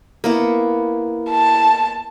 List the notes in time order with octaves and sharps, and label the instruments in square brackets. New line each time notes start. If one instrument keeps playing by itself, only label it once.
[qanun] A#3 B3 E4
[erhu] A5